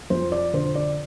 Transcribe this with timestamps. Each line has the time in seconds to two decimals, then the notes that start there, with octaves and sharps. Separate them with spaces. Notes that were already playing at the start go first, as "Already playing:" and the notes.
0.10 F2 C5
0.32 D5
0.53 D3 C5
0.75 D5